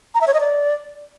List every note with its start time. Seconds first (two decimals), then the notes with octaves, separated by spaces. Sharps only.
0.14 A#5
0.21 E5
0.27 C#5
0.34 D#5
0.40 D5